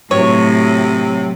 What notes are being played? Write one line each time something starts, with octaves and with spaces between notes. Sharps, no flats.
A2 C3 F#3 C#5